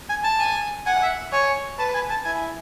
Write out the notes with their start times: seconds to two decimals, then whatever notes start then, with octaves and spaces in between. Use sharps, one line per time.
0.09 G#5
0.24 A5
0.40 G#5
0.86 F#5 G#5
1.02 E5
1.32 C#5 G#5
1.79 B4 A5
1.94 G#5
2.10 A5
2.25 E4 G#5